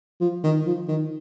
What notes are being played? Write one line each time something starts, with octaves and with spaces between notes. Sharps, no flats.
F3
D#3
F3
D#3